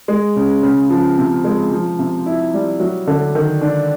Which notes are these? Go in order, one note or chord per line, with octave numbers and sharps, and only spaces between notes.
G#3
C#3
C#3
F3
C3
G#3
F3
C3
E4
G3
F#3
D3
D#3
D4